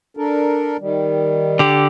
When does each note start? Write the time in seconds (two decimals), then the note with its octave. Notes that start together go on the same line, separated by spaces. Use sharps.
0.17 D4 A4 A#4
0.80 D#3 G3
1.59 D3 G4